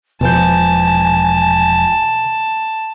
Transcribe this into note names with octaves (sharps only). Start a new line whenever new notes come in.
E1 B2 F3 B4 G#5 A5 G6